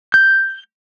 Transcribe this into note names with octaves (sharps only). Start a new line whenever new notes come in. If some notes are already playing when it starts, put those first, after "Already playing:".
G6